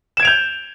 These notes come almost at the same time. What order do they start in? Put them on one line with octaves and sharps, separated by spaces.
E7 G#6 D7 F7 G6